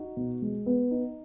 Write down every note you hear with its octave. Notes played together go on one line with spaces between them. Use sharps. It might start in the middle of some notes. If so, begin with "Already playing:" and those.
Already playing: D#4 F#4
B2
G#3
B3
D#4